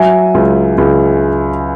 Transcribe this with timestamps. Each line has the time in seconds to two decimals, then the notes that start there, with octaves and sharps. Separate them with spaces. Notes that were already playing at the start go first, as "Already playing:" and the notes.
Already playing: F#3 E5 G#5
0.34 C#2
0.78 C#2